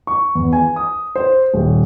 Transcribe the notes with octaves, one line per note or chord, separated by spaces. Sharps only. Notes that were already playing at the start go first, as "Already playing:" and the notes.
C#6
E2
G#5
D#6
C5
D#1